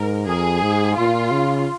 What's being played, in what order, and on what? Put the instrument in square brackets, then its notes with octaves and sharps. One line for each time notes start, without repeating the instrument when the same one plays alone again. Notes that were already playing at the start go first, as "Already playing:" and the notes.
Already playing: [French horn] G#2 [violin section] A#4
[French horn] F2 [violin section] G#4
[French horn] G#2
[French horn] A#2 [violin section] F4
[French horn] C#3